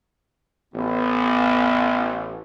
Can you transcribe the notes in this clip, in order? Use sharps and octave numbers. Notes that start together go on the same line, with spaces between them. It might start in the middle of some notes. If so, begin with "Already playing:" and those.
A1 B3